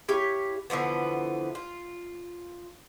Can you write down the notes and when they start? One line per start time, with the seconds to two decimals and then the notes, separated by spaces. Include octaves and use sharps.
0.09 E4 G4 C#5 F5
0.70 D3 E3 F3 B3
1.55 F4